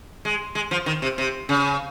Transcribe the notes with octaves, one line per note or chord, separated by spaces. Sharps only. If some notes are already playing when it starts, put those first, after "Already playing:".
G#3
G#3
F3
D#3
C3
C3
C#3